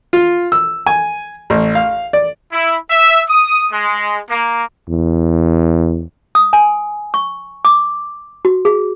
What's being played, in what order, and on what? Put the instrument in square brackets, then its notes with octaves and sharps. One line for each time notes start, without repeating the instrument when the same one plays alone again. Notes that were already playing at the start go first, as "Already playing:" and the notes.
[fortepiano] F4
E6
G#5
A1
F5
D5
[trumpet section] E4
E5
D#6
G#3
A#3
[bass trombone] E2
[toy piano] D#6
G#5
C#6
D6
F#4
G#4